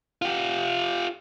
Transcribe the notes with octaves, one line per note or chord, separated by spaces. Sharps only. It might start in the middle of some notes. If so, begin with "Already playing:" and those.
F4 G4